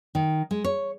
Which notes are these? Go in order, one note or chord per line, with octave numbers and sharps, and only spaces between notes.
D#3
G#3
C#5